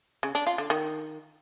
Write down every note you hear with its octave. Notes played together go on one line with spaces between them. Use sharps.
C#3
D4
F4
D3
D#3